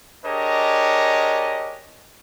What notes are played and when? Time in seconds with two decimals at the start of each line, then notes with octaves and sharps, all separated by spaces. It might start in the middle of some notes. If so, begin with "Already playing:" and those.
0.24 D4 G4 G#4 A#4 C#5 D#5